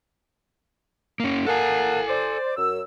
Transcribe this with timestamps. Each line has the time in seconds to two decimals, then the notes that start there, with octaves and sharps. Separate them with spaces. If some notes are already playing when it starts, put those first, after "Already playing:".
1.20 A#3 C#4
1.46 A#3 A4 F#5 G#5 A5
2.08 C5 D5
2.57 F#2 E6